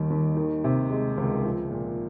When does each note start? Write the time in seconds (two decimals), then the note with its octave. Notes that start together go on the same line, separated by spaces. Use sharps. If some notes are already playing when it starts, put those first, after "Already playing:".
Already playing: D#2 D#3 G3
0.10 D#2
0.37 D#3
0.64 C3
0.91 G#3
1.18 C#2
1.45 F3
1.71 A#2